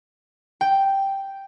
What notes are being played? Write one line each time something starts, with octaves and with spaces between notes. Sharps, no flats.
G5